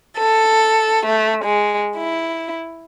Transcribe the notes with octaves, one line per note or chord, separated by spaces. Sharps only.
A4
A3
G#3
E4